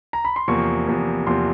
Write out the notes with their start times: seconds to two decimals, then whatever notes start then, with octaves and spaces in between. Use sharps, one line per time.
0.13 A#5
0.25 B5
0.36 C6
0.48 E2 C3 F3 A#3 C#6
0.87 E2 C3 F3 A#3
1.27 E2 C3 F3 A#3 C6